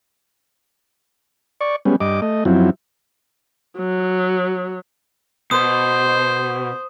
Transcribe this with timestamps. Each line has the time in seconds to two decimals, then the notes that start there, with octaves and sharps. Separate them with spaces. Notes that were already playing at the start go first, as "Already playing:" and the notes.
1.61 D5 C#6
1.85 G3 G#3 B3 C#4
2.01 G2 D#5 D6
2.22 A3 D#5
2.45 F#2 F3 F#3 C4 E4
3.77 F#3
5.51 B2 C5 D#6